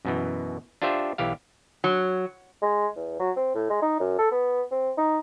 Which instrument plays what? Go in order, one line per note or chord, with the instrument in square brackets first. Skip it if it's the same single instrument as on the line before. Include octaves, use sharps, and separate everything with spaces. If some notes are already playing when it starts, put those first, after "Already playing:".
[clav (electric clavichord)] F#2 B2 E3
D4 F4 G4 C5 E5
B1 E3 G4 F5
[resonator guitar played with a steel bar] F#3
[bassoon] G#3
E2
F#3
C4
A2
G#3
D#4
F#2
A4
B3
C4
D#4